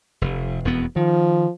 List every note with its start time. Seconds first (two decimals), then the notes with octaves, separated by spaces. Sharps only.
0.21 F1
0.65 E1 F2 B3
0.96 D#3 F3